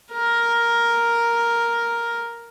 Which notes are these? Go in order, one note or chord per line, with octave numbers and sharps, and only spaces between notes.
A#4